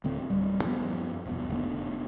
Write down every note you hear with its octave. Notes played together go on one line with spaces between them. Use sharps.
D1 D3 A3 C4
D1 G3
F#2 F3 B3
E1 C2 B2
F1 D3 A3 B3